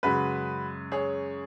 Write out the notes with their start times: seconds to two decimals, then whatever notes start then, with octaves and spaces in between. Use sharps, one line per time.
0.03 F#2 C#3 G#3 F#4 B4
0.92 G#4 C#5